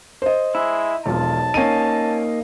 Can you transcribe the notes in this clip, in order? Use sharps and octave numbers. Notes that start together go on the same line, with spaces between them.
C5 D#5
G#3 E4
E1 B1 F3 F4 A5
A#3 C#4 D#4 D#7